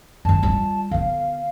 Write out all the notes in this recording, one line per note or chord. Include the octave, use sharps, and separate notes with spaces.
F#2 D#3 A5
G3 F4
D3 B3 F5